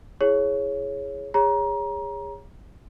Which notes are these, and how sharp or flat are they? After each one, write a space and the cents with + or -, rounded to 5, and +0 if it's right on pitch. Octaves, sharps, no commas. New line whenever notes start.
E4 +0 G#4 +0 C#5 +0
G#4 -35 C#5 +0 A#5 +25